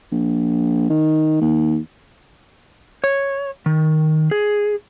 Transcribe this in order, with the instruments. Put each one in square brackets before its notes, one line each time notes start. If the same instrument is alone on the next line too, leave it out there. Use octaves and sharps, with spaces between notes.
[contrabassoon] A#1
D#3
D#2
[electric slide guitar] C#5
D#3
G#4